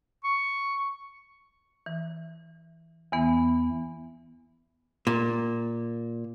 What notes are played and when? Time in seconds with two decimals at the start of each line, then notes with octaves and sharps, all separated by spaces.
0.24 C#6
1.86 E3
3.12 E2 E3 B3
5.07 A#2